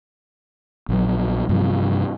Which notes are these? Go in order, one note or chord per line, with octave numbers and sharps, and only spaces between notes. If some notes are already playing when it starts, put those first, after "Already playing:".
A#1 F#3
G2 C3 F3